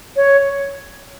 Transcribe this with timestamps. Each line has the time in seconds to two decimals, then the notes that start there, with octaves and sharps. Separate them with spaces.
0.16 C#5